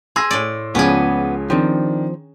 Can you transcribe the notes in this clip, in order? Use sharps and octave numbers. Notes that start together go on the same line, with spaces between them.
G#4 C6 E6 A#6
A2 D5
C#2 F3 B3 C#4 G#4 D5
D#3 F3 C4 D4